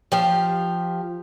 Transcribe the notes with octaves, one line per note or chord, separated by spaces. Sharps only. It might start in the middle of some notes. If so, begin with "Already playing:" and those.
F3 G4 F5